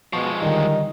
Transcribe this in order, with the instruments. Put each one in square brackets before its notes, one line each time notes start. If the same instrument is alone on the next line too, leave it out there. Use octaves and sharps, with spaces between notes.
[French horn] B2 [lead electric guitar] F3 G#3 [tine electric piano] C#6
[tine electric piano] D3 G3 [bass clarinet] D#3 [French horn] D#4